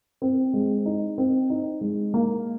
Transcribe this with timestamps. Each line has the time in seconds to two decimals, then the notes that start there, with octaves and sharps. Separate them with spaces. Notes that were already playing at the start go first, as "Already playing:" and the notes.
0.22 C4
0.54 G#3
0.86 D#4
1.18 C4
1.50 D#4
1.81 G#3
2.14 A#3